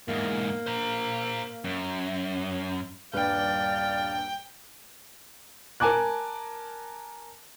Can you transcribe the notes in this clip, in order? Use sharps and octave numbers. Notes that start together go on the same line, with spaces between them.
E2 G#2 A#3
C5 A#5
F#2
D#1 G2 B4 D5 F5 G5
A#4 G#5 A5 D6 F#6